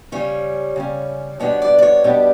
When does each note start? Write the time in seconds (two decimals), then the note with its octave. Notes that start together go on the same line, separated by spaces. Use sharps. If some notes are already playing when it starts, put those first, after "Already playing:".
0.12 C#3 G3 C#4 C#5
0.76 C#3 G3 C#4
1.40 B2 G3 B3 D4 C#5
1.62 D5
1.78 D5
1.82 C#5
2.04 B2 G3 B3 D4 G4